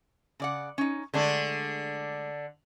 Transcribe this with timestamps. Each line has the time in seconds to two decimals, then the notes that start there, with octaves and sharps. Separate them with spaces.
0.40 C#3 D5 F#5
0.78 C#4 D#4
1.14 D3 G#3 A3 D4 G#4